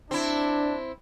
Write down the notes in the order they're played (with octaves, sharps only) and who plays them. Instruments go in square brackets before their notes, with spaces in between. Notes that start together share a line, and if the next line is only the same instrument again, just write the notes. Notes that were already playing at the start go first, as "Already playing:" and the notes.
[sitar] C4 E4 [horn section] D4